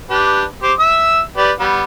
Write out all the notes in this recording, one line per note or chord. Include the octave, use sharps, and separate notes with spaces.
D4 G4 B4
G4 C5 D6
E5 E6
G4 B4 D5
G3 B3